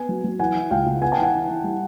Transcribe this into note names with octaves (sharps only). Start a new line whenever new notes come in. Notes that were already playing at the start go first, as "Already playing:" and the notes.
Already playing: B3 G#5
F#3
F#3
E3 F#5 G#5
E3
C#2 F5 G5
C#2
B3 F#5 G#5
G5 A5
E3
F#5 G#5
E3
E3
G3